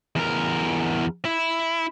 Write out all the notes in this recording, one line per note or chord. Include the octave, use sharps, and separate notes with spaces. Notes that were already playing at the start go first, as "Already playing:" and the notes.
E2 A#4
E4